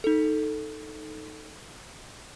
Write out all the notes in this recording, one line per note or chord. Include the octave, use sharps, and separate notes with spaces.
D#4 A4